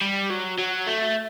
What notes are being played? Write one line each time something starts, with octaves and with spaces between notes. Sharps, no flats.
G3
F#3
F#3
A3